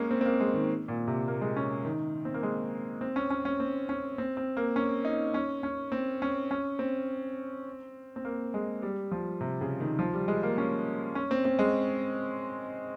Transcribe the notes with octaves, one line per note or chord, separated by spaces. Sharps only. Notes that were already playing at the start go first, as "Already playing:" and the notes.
Already playing: G#3 A#3 C#4
C4
C4
A#3
G#3
D#3
A#2
C3
A#3
G#3
C#4
D#3
C4
A#3
G#3
C4
C#4
C#4
C#4
C4
C#4
C4
C4
A#3
C#4
D#4
C#4
C#4
C4
C#4
C#4
C4
C4
A#3
G#3
G3
F3
C3
C#3
D#3
F3
G3
G#3
A#3
C#4
C#4
C4
C4
G#3